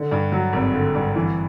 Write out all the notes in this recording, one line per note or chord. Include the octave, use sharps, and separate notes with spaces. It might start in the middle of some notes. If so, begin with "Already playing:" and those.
Already playing: D3
G2
F#3
G#1
D3
G2
E3